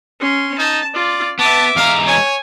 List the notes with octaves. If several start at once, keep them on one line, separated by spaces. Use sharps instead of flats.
C#4 C6
D#4 A5
F4 D5
B3 E5 A5 D6
E2 G#3 F5 A#5
C#5 G#5